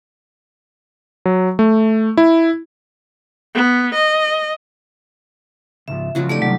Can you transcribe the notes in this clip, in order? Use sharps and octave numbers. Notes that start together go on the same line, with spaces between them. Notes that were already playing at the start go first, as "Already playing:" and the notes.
F#3
A3
E4
B3
D#5
C#2 G#2 F3 E5
C#3 F3 F#3 F4 F#4
A3 D#4 G4 A4 D5
C3 D#3 F#3 G3